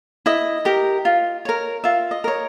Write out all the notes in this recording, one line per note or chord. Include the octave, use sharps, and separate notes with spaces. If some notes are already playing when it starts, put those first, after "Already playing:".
E4 D#5
G4 A#4
F4
A#4 C#5
F4 E5
D#5
A#4 C#5